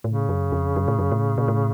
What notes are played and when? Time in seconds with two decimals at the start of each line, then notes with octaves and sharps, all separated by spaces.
0.04 A2 C#3
0.29 F#2
0.52 F2
0.76 F#2
0.88 A2
0.99 F#2
1.12 A2
1.38 A#2
1.48 A2